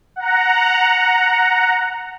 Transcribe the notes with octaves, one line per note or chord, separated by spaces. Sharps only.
F#5 A#5